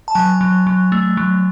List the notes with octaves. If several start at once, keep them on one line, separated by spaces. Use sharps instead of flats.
A5
F#3 G#5
F#3
F#3
A3
F#3